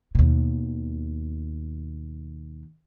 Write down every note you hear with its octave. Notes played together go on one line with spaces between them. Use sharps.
D#2 B2